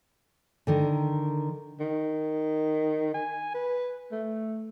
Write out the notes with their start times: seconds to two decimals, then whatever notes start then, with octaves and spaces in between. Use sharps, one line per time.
0.67 D3 D#3 A#4
1.80 D#3
3.14 G#5
3.54 B4
4.12 A3